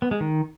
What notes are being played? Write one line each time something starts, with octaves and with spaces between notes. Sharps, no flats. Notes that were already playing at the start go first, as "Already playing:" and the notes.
B3
G#3
D#3